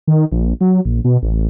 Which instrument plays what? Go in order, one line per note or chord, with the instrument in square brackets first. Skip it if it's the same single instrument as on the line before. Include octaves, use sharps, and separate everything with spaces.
[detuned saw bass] D#3
A#1
F#3
A#1
B2
A1